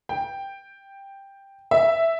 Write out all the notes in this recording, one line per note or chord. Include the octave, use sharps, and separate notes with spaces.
G5
E5